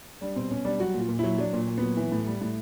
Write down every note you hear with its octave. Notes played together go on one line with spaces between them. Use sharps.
G3 D4
B2 C4
B2 C#4
G3 D4
F#3 F#4
A#2 F4
A#2
F#3 E4
F#3 D4
A#2
A#2
F#3 B3
E3
A2
G3
A2